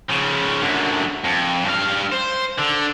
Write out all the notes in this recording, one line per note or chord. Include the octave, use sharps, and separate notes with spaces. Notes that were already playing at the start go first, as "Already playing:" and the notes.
C#3 F3
F#2 D3
F2
G2 F5
C5
D3